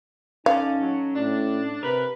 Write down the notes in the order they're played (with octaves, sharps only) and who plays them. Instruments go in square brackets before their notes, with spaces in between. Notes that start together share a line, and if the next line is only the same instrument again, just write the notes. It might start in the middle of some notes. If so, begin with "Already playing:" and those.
[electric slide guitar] C#4 A4 [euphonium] D#4 [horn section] D5 G#5 [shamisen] F5
[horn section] F#3
[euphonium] A2 [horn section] D4
[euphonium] C3 [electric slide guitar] A#4 [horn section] B4